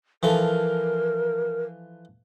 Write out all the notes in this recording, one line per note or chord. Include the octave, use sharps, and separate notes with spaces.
E3 F3 A4 A#4